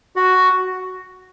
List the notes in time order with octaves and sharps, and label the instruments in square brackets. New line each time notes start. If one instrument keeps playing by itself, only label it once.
[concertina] F#4